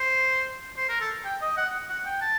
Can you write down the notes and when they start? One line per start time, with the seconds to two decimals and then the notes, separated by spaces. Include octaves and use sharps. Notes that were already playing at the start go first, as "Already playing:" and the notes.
Already playing: C5
0.77 C5
0.89 A#4
1.01 A4
1.25 G5
1.42 D#5
1.57 F#5
1.89 F#5
2.06 G5
2.22 A5